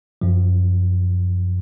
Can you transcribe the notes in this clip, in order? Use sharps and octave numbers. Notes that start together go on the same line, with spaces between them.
F#2 F3